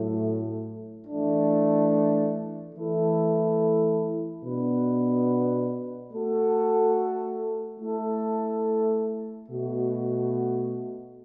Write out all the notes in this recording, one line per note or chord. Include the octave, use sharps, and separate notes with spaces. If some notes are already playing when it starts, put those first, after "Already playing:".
Already playing: A2 F#3 A3
E3 A3 D4
E3 A3 E4 A4
B2 B3 D4 B4
A3 F#4 A4
A3 E4 A4
B2 A3 F#4